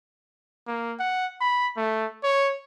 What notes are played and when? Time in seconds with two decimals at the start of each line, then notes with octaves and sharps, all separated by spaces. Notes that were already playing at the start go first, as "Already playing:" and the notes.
0.67 A#3
0.99 F#5
1.40 B5
1.77 A3
2.23 C#5